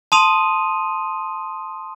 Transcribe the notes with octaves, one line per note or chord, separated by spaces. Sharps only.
A5 C6 D#6 D#7 F7